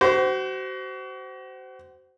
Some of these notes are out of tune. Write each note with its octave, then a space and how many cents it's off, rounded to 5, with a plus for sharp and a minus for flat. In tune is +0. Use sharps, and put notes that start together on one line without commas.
F#4 +35 C5 -20